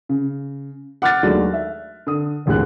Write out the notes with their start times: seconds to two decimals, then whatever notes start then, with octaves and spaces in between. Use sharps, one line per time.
0.09 C#3
1.02 F#5 D6 F6 F#6 A6
1.23 D#2 F#3 G#3 A3 D4
1.54 E5
2.07 D3 D#6
2.46 D#1 A1 D#2 G#3 F#6